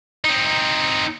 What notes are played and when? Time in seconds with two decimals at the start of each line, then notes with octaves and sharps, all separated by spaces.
0.25 C4 D#4